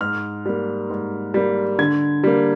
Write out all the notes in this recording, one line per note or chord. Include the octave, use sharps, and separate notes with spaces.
G#2 F6
G3 A#3
G#2
G3 A#3
D3 G#6
G3 A#3